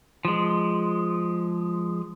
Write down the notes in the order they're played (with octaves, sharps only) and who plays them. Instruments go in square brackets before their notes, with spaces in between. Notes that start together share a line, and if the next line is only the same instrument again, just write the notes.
[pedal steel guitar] F3 G#3